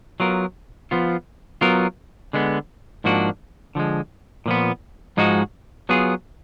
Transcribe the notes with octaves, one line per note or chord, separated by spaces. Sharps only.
F#3 B3 F4 A#4
F3 B3 F4
F#3 B3 F4 A#4
D3 G#3 B3
G#2 F3 A#3 D4 F#4
D3 F3 G#3
A#2 F3 B3
G#2 F3 G#3 D#4 F#4
F#3 B3 F4 G#4